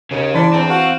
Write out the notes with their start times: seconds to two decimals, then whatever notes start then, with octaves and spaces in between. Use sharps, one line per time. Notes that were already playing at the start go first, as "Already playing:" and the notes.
0.11 D#2 C#3 C#4
0.35 E3 D4 E4 D5
0.53 E2 C4 D4 A5 A#5
0.70 F#4 F5 F#5